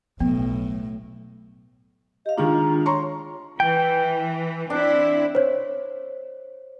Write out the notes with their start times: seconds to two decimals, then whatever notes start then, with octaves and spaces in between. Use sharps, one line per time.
0.20 B1 A2 F#3 B3
2.26 G4 D#5 F5
2.38 D#3 G#3 D4 F4 A#5
2.86 C#5 A#5 C6 C#6
3.60 E3 G5
4.70 C4 D4 E4
5.35 C5 C#5